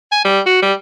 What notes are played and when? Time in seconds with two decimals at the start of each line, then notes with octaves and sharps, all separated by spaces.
0.12 G#5
0.25 G3
0.46 F#4
0.62 G3